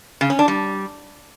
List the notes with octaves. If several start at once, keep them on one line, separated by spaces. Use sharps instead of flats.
C#3
C#4
D4
G3